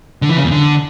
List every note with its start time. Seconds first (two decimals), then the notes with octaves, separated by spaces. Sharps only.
0.22 D3
0.29 E3
0.37 C#3
0.44 E2
0.51 D3